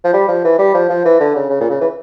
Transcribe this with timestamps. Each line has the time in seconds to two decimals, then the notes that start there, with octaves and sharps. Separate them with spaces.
0.05 F3
0.13 G3
0.28 F3
0.45 E3
0.59 G3
0.74 F3
0.89 F3
1.05 E3
1.20 D3
1.36 C#3
1.50 C#3
1.61 A#2
1.70 C#3
1.81 E3